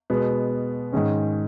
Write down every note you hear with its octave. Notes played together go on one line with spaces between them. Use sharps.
B2 G#3 B3
G#2 D#3 G#3 C#4